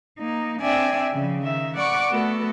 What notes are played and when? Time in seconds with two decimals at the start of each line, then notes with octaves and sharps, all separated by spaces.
0.18 A#3 D#4
0.61 C4 D4 D5 E5 G5 G#5
1.13 C#3 F3
1.43 D#3 E5
1.75 D5 F#5 B5 C#6 D6
2.10 A3 B3 F#4 A4